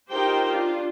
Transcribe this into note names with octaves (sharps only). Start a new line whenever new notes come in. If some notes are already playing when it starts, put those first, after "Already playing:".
D#4 F4 G4 A#4 C5 G5
D4 F4